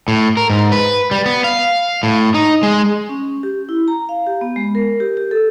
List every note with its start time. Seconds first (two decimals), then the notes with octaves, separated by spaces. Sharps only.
0.08 A2
0.37 A#4
0.50 G#2
0.72 B4
1.11 G3
1.26 B3
1.44 F5
2.03 A2
2.34 D#4
2.63 G#3
3.09 C#4
3.43 G4
3.69 E4
3.88 A#5
4.09 F5
4.26 G4
4.41 B3
4.56 G#3
4.75 A#4
5.00 G4
5.17 G4
5.31 A4